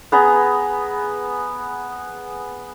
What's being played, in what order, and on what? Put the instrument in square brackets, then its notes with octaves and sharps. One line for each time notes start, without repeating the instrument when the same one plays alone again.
[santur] B3 G#4 B4 A#5